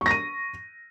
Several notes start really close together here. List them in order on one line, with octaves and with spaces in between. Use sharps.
C#6 A#6 D#7